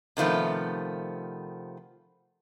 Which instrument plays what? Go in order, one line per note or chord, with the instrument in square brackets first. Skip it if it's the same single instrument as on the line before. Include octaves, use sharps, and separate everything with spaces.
[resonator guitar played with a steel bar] C3 D#3 F3 A3 B3